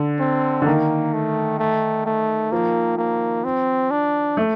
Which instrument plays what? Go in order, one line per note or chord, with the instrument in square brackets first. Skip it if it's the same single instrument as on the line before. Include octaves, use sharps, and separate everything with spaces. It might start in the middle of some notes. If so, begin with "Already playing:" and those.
Already playing: [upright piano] D3
[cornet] C4
[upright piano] D3
[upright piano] D#3 [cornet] A#3
[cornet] A3
A3
A3
[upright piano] F3 [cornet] A#3
[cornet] A#3
C4
D4
[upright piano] A3